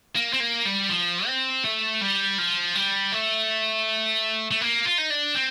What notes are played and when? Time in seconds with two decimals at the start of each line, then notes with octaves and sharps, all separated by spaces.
0.16 A#3
0.33 C4
0.40 A#3
0.65 G3
0.89 F3
1.27 C4
1.64 A3
2.01 G3
2.38 F3
2.75 G3
3.13 A3
4.51 A3
4.61 A#3
4.86 F4
4.98 D#4
5.10 D4
5.35 C4